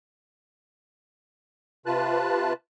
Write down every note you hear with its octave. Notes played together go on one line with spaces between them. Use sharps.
C3 F4 B4 A5 F#6